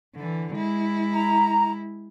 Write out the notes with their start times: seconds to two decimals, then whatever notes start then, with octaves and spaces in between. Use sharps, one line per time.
0.16 D3 E3
0.55 G#3 E4
1.14 A#5